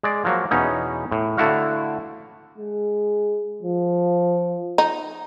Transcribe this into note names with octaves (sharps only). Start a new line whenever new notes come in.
G#3 D5
F3 F#3 A#3
E2 B2 C#4 D#4
A2
D3 A3 E4 F#4 F5
G#3
F3
D#4